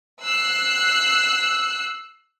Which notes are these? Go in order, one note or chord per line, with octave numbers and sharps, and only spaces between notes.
E6 F#6 C7